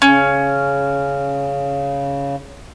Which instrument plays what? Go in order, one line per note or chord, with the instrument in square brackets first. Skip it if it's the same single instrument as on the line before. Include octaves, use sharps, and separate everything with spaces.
[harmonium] C#3 [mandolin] C#4